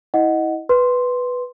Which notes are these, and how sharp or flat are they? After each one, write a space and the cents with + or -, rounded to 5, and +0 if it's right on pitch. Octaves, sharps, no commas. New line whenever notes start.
E4 -25 D#5 +0 F#5 +0
B4 +0 C6 +0